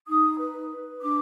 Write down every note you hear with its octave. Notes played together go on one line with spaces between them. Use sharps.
D#4 D#6
B4
B4
D4 D6